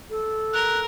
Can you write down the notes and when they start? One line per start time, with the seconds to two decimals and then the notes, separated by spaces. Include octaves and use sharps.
0.10 A4
0.53 A#4 F#6